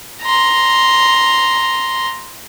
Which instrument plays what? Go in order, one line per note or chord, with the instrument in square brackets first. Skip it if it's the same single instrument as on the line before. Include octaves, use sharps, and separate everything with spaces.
[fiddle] A#5 C6